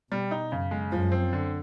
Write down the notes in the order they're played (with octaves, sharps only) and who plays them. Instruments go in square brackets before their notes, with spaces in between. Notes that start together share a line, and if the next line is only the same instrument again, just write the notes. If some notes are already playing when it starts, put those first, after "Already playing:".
[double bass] B2 [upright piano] G3
[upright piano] D#4
[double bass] F#2 [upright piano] C#3
[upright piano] G#3
[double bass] F#2 [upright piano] F3
[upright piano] C4
D3